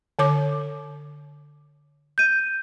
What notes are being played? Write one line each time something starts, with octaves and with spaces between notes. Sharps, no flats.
D3 C#5 D6
G6 D#7